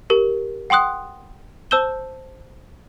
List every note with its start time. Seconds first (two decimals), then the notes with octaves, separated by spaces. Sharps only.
0.10 G4 A#4
0.70 F#5 G5 C6 D#6 F#6
1.71 C5 A5 E6 G6 E7 G7